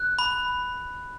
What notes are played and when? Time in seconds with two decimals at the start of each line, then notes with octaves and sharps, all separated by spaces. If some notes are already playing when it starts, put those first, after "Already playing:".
Already playing: F#6
0.19 B5